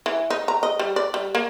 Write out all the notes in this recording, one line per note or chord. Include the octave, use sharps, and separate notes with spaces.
E3
D#4
A#5
D#5
G3
D5
G3
A#3